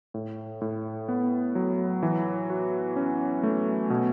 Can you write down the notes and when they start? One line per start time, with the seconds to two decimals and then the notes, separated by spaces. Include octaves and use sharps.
0.14 A2
0.61 A2
1.08 B3
1.55 F#3
2.03 E3
2.50 F#4
2.96 C#4
3.43 A3
3.90 B2